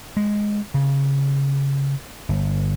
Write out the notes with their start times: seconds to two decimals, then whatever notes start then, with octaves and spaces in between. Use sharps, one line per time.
0.17 G#3
0.74 C#3
2.29 G1